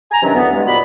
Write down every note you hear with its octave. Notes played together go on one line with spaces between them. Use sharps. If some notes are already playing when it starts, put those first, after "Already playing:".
G#5 A#5
C3 D#3 E3 F#3 C#4 D4
D2 G2 E3 B3
G2 G#3
D#2 A#2 F#4 B5